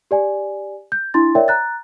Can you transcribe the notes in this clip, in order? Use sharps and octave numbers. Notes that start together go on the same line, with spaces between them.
G4 D5 G#5
G6
D4 E4 C6 A6
A#4 C#5 D5 E5 G5
A#5 F#6 A6